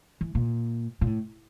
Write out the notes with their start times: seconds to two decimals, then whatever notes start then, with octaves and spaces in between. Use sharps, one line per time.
0.21 E3
0.35 A#2
1.01 A#2
1.07 A2